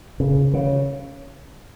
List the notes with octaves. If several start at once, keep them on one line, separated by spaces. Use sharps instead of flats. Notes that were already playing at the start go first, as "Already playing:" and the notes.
C#3
C#3